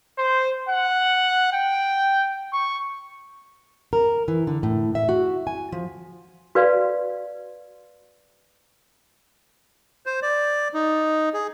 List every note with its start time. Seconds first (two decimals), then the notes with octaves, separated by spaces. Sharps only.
0.18 C5
0.69 F#5
1.53 G5
2.53 C#6
3.93 A#4
4.28 E3
4.47 D3
4.63 A2
4.95 E5
5.09 F#4
5.47 G#5
5.72 F3
6.55 F#4 B4 D5 F5
10.06 C5
10.22 D5
10.74 D#4
11.34 G#4